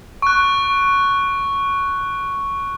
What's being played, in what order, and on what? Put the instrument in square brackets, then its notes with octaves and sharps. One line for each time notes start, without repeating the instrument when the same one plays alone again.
[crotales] C#6 F#6